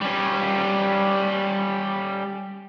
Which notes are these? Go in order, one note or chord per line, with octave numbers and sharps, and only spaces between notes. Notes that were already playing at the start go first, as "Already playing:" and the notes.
G3 C#4